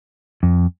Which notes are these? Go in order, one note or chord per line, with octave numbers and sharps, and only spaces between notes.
F2